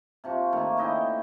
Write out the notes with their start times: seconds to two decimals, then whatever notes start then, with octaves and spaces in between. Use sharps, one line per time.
0.24 C3 F3 C#6
0.52 D#3 A3 A#3 C#6
0.77 C#3 E4 D#5 G5